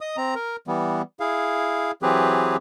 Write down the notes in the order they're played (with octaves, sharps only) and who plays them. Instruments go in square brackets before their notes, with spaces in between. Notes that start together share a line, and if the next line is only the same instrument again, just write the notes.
[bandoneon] D#5 D#6
C4 A#5
A#4
E3 G3 B3
E4 G#4 F5
E3 F#3 C4 G4 G#4 B4